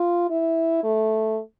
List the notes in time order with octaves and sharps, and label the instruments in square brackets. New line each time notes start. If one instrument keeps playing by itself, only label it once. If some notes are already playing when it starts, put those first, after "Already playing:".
Already playing: [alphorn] F4
E4
A3